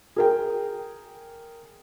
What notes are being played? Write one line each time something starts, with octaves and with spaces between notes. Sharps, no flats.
G#4 A#4 G5